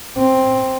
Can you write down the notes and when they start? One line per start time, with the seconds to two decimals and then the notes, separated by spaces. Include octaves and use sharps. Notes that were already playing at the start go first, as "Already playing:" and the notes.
0.18 C4